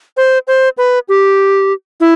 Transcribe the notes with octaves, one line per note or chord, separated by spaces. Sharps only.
C5
C5
B4
G4
E4